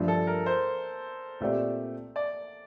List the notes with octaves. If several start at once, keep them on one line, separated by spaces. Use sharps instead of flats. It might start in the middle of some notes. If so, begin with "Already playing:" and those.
Already playing: G2 F3 A3 D4
A4
A#4
C5
A#2 A3 C4 G4 D5
D5